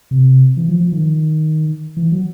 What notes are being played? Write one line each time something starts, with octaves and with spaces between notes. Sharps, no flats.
C3
E3
F3
F3
D#3
E3
F#3